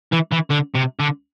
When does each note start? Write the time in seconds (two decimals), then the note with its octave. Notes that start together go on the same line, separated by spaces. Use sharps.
0.12 E3
0.32 E3
0.50 D3
0.75 C3
1.00 D3